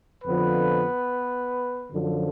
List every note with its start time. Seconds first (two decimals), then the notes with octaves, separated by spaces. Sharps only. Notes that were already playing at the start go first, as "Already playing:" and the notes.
0.24 F2 D3 F3 B3 B4
1.91 F#2 D3 F3